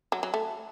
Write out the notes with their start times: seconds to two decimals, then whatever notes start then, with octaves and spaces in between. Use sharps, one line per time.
0.12 F#3
0.23 F#3
0.34 A3